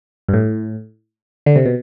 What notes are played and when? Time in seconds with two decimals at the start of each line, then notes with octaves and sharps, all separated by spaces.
0.29 G2
0.34 A2
1.46 D3
1.56 C3
1.66 B2